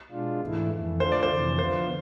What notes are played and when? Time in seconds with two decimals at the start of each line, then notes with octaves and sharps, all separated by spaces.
0.11 B2 G#3 D4 F4
0.41 G#2 E3 A3 E4
0.70 F2 E3 A3
1.00 D3 A3 D4 F4 C5
1.12 D5
1.23 C5
1.30 F2 C3 E3
1.59 D3 F3 B3 F4 C5